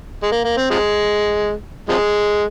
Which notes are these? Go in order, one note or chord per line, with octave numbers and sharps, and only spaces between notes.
G#3
A#3
A#3
C4
C3 F3 G#3
C3 F3 G#3